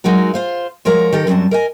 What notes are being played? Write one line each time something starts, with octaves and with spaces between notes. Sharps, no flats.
F#3 G#3 D#4 F#4 A#4
F4 C5 F5
F3 G#3 F#4 A#4 C#5
D#3 G4 A4 A#4 G5
F#2 F#3 G3 C4 A5
A#4 D#5 G#5